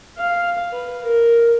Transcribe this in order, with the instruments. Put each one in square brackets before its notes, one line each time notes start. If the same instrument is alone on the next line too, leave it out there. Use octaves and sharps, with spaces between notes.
[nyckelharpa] F5
B4
A#4